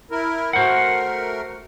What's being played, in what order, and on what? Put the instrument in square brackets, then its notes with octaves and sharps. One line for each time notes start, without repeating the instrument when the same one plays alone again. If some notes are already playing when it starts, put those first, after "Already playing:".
[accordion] E4 A#4
[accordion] A3 A#4 [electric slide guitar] F#4 C5 F#5